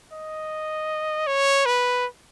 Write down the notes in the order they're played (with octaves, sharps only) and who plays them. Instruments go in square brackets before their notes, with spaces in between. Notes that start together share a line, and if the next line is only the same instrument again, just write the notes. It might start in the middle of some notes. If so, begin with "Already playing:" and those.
[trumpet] D#5
C#5
B4